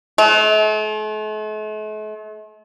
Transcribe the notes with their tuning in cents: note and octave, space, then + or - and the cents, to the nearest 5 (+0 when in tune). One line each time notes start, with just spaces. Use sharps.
A3 -45